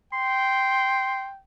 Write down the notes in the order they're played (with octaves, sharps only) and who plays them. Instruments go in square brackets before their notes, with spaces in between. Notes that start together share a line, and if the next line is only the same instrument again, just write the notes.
[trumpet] G5 [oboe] C6